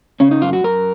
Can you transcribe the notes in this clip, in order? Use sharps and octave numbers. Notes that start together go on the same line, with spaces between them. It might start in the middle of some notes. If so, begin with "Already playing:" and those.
C#3 C#4
D#4
F#2 F4
F#4
F#2 A#4